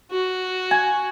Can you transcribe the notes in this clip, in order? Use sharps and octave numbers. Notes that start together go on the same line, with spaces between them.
F#4
G#5